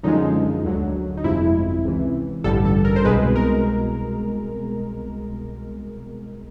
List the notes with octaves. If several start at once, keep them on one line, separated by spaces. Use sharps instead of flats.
F#2 D3 F3 G#3 D#4
D2 D3 F#3
D#4
G1 F2 C3 F3 G#3 E4
C#2 C3 E3
A1 G2 D3 G3 A4
A4
A#4
C5
C2 B2 G#3 B4
A#4